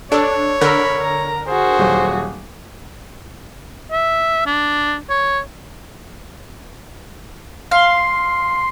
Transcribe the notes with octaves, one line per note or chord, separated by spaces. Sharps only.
D4 A4 C#5 E6
D3 A#4 B5 E6 F#6
A#5
F#4 G#4 C5
D#1 F#3
E5
D4
C#5
F5 C6